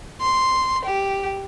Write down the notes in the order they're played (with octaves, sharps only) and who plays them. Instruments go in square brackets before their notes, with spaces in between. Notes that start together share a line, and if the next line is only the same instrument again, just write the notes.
[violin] C6
G4